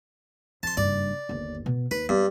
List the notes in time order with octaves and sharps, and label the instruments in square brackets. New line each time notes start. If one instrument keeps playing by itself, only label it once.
[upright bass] F2 [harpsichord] A5 C6
[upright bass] F#1 G2 [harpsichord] D5
[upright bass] G1 D#2
B2
[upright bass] D#2 [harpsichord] B4
[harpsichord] G2 [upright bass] B3